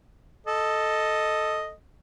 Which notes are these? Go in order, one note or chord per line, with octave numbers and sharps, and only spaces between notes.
A4 D#5